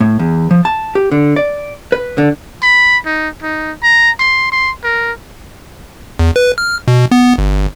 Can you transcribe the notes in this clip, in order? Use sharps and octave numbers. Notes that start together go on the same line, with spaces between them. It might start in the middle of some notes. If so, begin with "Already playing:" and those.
A2
E2
F3
A5
G4
D3
D5
B4
D3
B5
D#4
D#4
A#5
C6
C6
A#4
E2
B4
F6
B2
B3
G1